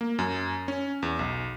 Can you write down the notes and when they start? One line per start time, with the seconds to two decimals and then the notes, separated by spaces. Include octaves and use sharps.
0.01 A#3
0.19 F#2
0.68 C#4
1.02 E2
1.19 B1